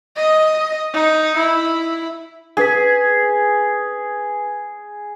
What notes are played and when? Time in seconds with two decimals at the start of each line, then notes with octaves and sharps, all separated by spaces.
0.16 D#5
0.93 D#4
1.37 E4
2.57 D4 G#4 B4 B6